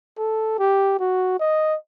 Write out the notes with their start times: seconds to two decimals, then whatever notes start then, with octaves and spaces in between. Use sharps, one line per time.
0.18 A4
0.59 G4
0.99 F#4
1.39 D#5